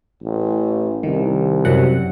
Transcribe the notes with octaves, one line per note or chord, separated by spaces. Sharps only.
A1
C2 D#3
F#2 C3 F#5